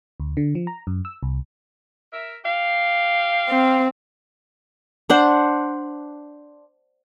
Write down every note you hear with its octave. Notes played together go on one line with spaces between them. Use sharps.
D2
D3
F3
A#5
F#2
E6
C2
A#4 E5
G4 F5
C4
D4 C5 F#5